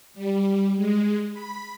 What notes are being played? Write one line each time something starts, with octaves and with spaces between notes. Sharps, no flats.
G3
G#3
B5